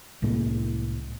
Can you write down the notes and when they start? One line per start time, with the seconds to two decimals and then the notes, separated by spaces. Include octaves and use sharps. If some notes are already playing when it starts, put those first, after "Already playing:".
0.22 C2 A2 G#3 A#3